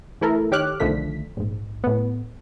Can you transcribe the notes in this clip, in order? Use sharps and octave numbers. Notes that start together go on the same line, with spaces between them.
E3 A3 E4 A4 A#4
D#3 G4 C#5 D6 F6 F#6
B1 D3 D#3 F3 A3 B6
A#1 G#2
A2 B3